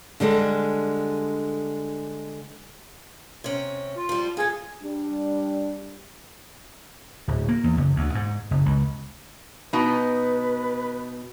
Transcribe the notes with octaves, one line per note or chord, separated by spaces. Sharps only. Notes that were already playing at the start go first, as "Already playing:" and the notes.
D3 G3 G#3 A4
C3 C#4
F4
F3 G3
F4 G#4 A4
G3 D4
D1
A#3
E2
F#1
D2
G#2
F#1
C#2
B2 D#4 B4